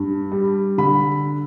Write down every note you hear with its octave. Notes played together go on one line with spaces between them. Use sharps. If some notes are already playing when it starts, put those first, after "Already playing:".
Already playing: G2
G3
D3 B5